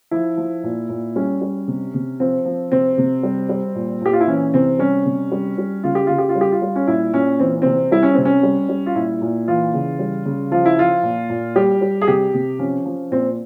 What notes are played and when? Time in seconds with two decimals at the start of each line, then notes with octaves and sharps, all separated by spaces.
0.11 F3 E4
0.37 F3
0.64 A#2
0.89 A#2
1.16 G3 C#4
1.41 G3
1.68 C3
1.94 C3
2.20 F3 C4
2.45 F3
2.72 C3 C4
2.98 C3
3.23 G3
3.49 G3
3.76 A#2
4.01 A#2 G4
4.13 F4
4.20 E4
4.27 E3 C#4
4.54 C3 C4
4.79 G3 C#4
5.06 C3
5.32 G3
5.58 G3
5.83 C#3 F4
5.95 G4
6.07 C#3 F4
6.18 G4
6.29 F4
6.35 G3
6.41 G4
6.52 F4
6.62 G3
6.76 C#4
6.87 A#2 E4
7.13 A#2 C#4
7.40 E3 C4
7.62 C3 C4
7.91 G3 E4
8.03 C#4
8.14 C3 C4
8.25 C#4
8.43 G3
8.69 G3
8.86 F4
8.95 A#2 E4
9.22 A#2
9.48 E3 F4
9.74 C#3
9.99 G3
10.25 C#3
10.52 F3 F4
10.65 E4
10.78 F3 F4
11.03 A#2
11.30 A#2
11.56 G3 G4
11.82 G3
12.02 G#4
12.08 C3 G4
12.34 C3
12.59 F3 C#4
12.85 F3
13.11 A#2 C4